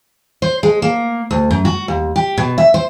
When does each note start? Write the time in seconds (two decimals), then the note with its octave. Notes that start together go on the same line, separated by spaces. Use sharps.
0.42 C5
0.63 G#3
0.82 A#3
1.31 D2
1.51 F#2
1.65 F#4
1.88 D#2
2.16 G4
2.37 B2
2.58 E5
2.74 C5